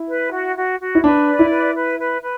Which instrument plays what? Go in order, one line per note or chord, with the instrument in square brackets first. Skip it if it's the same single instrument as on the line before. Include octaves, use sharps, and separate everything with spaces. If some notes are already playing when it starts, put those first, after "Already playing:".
Already playing: [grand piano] E4
[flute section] B4
F#4
F#4
F#4
[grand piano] E4
[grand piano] D4 [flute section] B4
[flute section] D5
[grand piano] E4
[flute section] B4
B4
B4
B4